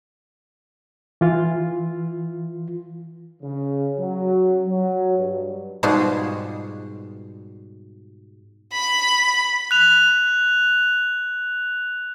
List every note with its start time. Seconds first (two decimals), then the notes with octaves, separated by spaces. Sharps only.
1.21 E3 F4
3.43 C#3
4.00 F#3
4.67 F#3
5.18 G2
5.83 G#2 B2 G3 F4 F#4 G#4
8.73 B5
9.71 F#6 F7